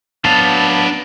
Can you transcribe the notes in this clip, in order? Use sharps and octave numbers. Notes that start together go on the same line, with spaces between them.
F#3 B3 D4 F5 A5